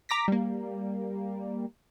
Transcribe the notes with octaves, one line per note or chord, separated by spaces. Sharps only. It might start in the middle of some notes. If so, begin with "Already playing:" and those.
A#5 D6 A#6 B6
G3 A#3